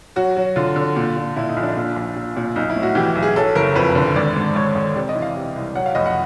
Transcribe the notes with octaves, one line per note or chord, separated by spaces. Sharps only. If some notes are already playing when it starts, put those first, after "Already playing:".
F#3 F#4
F#3
D3 F4
D3
A#2
A#2
A#2 E4
D#4
A#1
D4
A#2
A#1
A#2
A#2
B1 D#4
E4
A2
F#4
E3 G4
B1
G#4
F#3 A4
F#1 A#4
F2 B4
D3
G#1 D5
G#2
G#1 C#5
G#1
C3 D5
D#5
E3
F5
C3
C2
F#3 F#5
F5
F1 D#5
F#5